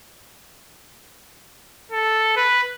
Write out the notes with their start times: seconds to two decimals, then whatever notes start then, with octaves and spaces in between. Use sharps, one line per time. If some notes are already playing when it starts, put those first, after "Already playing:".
1.92 A4
2.36 B4